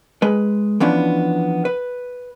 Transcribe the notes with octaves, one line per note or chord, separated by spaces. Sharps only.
G#3 B4
E3 F3 B3 C#4 D4
B4